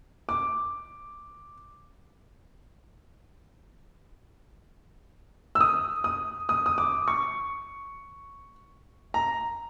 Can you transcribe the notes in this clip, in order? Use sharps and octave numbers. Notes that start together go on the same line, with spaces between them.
D6
E6
D#6
D#6
D#6
D#6
D6
C#6
A#5